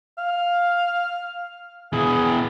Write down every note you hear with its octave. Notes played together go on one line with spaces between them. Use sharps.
F5
B2 E3 G#4